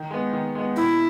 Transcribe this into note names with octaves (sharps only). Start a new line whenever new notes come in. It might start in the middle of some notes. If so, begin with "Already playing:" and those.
Already playing: D#3
G#3 B3
D#3
G#3 B3
B2 E4